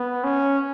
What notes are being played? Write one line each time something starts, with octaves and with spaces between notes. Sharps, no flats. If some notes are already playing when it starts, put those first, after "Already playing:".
Already playing: B3
C#4